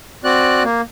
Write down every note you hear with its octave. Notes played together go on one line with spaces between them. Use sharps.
C4 F#4 D5 F#6
A#3